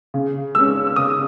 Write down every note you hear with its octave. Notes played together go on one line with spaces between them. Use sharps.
C#3
G#3 C#4 E6
E6
C#3 D#6